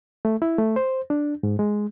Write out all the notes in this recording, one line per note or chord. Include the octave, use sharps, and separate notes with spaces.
A3
E4
A3
C5
D4
G#2
G#3